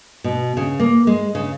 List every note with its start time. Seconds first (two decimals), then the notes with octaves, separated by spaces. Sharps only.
0.24 B2
0.57 C#3
0.80 A#3
1.07 G#3
1.35 C#3